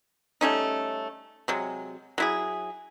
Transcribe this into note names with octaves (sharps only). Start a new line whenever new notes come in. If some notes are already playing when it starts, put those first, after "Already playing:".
G3 A3 C#4 D#4
C3 F#3 G#3
F#3 E4 G#4